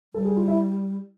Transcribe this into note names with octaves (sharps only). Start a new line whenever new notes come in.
G3 A4
G#4
F4
E4